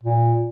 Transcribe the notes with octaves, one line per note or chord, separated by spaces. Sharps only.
A#2